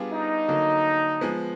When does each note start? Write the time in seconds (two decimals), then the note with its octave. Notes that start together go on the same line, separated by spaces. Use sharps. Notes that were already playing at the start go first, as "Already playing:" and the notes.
Already playing: G3 B3 D4 F4 G#4
0.12 D#4
0.48 D3 F#3 A#3
1.21 F3 G#3 B3